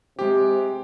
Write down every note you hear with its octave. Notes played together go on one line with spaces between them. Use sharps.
C3 G#3 G4